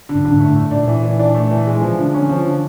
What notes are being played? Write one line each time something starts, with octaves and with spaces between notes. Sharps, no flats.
D3
G2
G#2 D3
A2 A3
A3
A#2 D4
E3
E3
D4
A3
E3
G#3
F3
D3
C#4
F3
D3